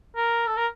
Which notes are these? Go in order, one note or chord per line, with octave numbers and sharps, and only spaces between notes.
A#4
A4
A#4